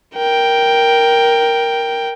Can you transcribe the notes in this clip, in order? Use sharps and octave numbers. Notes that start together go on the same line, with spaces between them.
A#4 G5